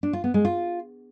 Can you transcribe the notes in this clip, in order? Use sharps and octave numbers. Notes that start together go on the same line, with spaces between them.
D4
F4
B3
G#3
F4